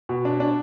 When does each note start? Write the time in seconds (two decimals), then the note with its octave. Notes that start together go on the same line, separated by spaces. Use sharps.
0.09 B2
0.25 D4
0.40 D4